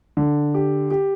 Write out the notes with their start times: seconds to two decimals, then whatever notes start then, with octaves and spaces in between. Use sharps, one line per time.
0.17 D3
0.54 G4
0.91 G4